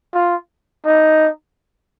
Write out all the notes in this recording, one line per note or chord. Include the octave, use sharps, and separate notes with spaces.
F4
D#4